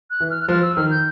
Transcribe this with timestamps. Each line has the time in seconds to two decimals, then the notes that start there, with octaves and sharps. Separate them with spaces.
0.11 F#6
0.20 E3
0.30 F6
0.43 F#6
0.48 F3 F6
0.62 E6
0.76 D#3 F6
0.91 G6